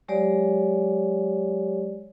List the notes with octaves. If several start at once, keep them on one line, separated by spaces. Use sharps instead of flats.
F#3 G#3 G4 C#5 D5